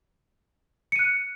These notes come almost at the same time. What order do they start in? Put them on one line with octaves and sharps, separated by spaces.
C#7 D#7 F#6